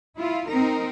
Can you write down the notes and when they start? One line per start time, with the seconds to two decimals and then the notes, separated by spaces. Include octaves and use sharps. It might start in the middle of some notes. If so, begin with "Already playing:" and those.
0.18 E4 F4
0.50 C4 D#4 A#4